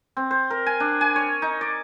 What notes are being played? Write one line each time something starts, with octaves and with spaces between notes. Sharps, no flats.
C4
C5
A#4
G#5
D4
G#5
C#5
D#4
D5